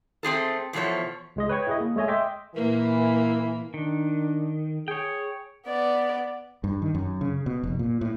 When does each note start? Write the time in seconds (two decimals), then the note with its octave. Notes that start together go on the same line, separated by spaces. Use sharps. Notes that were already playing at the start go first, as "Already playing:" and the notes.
0.23 A3 C4 G#4 A4
0.73 E2 B2 F3 A3 C#5
1.36 C#2 G#3 D#5
1.49 B4 C#5 G5 C#6 G#6
1.67 E4 G#4 D#5
1.81 A#3
1.96 G#3 A3 C#5 D#5 G#5
2.08 D#5 E5 G5 C6 D6
2.55 A#2 E3 A#3 A#4
3.74 D#3 D4
4.88 G#4 C#5 G5
5.67 B3 D5
6.64 G2
6.82 D#3
6.95 F#2
7.21 C#3
7.46 B2
7.63 F1
7.79 A#2
8.01 A2